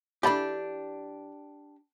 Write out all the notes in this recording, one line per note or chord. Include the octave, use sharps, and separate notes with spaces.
E3 D4 G4 A4 B5